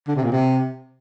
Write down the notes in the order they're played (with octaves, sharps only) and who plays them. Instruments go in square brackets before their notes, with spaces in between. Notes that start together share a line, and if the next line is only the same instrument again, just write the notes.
[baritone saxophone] D3
C3
A#2
C3